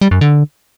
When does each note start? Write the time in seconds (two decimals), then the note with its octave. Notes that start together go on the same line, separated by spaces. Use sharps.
0.01 G3
0.11 F#2
0.21 D3